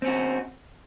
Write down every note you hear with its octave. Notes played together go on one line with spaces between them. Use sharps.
C4 C#4 F#4